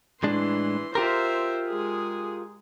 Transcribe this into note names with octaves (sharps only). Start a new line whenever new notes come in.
A2 E3 G#3 D4 C6
F4 G4 A#4 C5 E5
G#3 G#4